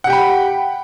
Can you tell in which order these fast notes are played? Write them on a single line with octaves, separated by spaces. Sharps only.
F#5 G4 G5 B5